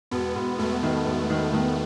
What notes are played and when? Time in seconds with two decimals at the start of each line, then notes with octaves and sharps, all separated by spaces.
0.11 E1 B3
0.35 E1
0.59 E1 A3
0.83 D#3
1.06 E1
1.30 D#3
1.53 D#3